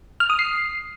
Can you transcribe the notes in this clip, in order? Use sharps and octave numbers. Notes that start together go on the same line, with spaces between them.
F6
D#6
C7